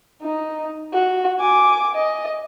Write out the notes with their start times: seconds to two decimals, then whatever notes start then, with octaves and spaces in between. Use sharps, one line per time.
0.22 D#4
0.93 F#4
1.40 G#5 D6
1.96 D#5